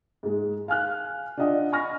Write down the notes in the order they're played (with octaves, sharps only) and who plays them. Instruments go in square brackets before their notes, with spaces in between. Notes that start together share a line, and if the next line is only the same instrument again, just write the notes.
[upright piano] G#2 G#3
F5 G#5 F6 F#6
D4 F4 D5 D#5 F#5
G#5 B5 C#6 F6 A#6